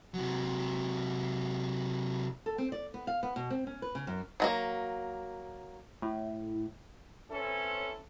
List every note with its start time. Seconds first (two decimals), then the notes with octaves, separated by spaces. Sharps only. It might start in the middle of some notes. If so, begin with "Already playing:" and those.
0.14 C3 F#3
2.46 A4
2.58 C4
2.72 D5
2.94 B3
3.07 F5
3.23 B3
3.36 B2
3.50 C4
3.67 C#4
3.82 B4
3.95 C#3
4.07 F#2
4.40 F#3 G#3 A#3
6.02 A2
7.31 C4 C#4 E4 A4 B4 C#5